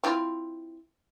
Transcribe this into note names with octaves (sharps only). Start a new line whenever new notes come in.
C4 E4 F4